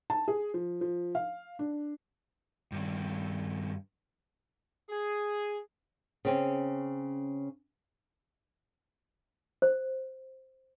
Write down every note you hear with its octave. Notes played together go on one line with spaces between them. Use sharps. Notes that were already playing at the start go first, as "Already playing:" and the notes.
A5
G#4
F3
F3
F5
D4
G2 D#3
G#4
C#3 C4 C#4
C5